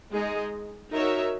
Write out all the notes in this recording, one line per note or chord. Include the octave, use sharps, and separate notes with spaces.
G#3 D#4 G#4 D#5
D#4 F#4 A#4 C#5 E5